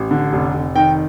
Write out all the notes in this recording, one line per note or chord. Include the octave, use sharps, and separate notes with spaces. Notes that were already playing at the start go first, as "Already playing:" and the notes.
Already playing: A1
D3
F1
F1
D#3 G5